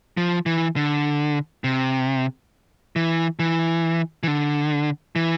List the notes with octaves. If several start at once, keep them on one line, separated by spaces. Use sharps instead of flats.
F3
E3
D3
C3
E3
E3
E3
D3
E3